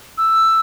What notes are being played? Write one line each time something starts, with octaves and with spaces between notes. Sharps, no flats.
E6